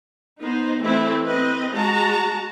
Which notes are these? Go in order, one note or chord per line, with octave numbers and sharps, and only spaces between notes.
B3 D#4 C5
E3 A3 C4 E4
C4 B4 D#5
G#3 F#4 A5 A#5